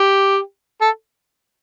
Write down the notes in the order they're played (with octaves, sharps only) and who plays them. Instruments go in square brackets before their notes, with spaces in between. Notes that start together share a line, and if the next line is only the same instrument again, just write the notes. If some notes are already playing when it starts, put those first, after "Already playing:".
Already playing: [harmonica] G4
A4